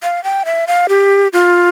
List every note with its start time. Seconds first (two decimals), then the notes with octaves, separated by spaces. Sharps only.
0.03 F5
0.24 G5
0.45 E5
0.67 F5
0.89 G4
1.33 F4